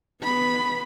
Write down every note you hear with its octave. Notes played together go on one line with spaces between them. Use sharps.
B3 B5